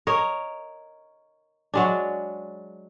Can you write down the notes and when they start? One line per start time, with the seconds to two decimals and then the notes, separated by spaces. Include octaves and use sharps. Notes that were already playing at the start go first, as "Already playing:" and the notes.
0.07 A#4 C#5 D#5
1.74 F#3 G#3 D4